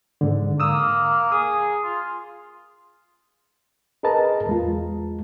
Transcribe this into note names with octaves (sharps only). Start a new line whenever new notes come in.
G#2 D3
A#3 D#6 E6
G#4 D#6
F4
G#4 A#4 B4 D#5 A5 A#5
E2 G#3 F4